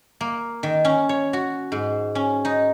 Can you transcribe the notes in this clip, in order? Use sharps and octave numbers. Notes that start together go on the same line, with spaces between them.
A#3
D#3
C#4
C#5
F#4
G#2
C#4
D#4